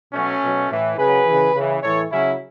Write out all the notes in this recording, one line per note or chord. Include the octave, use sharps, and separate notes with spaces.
B2 F#3 A3 C#4
B2 F#3
A2 E3
C#3 F#3 G#4 B4
C#3 E3
C#3 E3
A2 E3 A4 C#5
C#3 F#3 C#4 E4